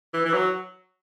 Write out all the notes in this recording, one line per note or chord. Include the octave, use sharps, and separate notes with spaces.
E3
E3
F#3